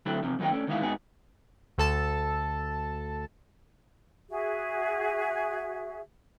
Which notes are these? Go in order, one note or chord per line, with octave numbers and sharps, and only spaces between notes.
D3 F#3 A3 C4 E4
E2 C3 F3
F#2 D#3 A#3 D#4 F4 G5
A3 C#4 D4
D2 D#3 G#3 A#3 E4 F5
G#2 B3 D#4 F#4 G#4
D2 A4 A5
F#4 G#4 E5